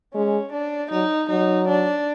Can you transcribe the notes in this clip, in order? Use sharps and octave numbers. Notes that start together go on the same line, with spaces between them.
G#3 C#4
D4
F#3 D#4
F#3 D#4
D4